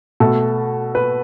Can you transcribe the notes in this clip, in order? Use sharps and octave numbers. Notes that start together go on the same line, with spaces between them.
B2 A3 A4
B4